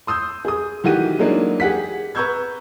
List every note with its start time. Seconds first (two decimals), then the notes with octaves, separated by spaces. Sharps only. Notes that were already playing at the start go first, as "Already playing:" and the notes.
0.07 C6 D#6 E6 G6
0.45 G#4 D#6
0.84 D#3 E3 A3 F#4 G4 D#7
1.19 E3 F#3 G#3 A#3 D4 D#4
1.60 G4 G#4 F#5 B6
2.15 B4 A#5 C#6 E6 G6 G#6